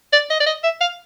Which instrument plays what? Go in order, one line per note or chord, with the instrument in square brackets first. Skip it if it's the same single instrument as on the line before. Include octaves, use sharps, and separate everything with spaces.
[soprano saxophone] D5
D#5
D5
D#5
E5
F5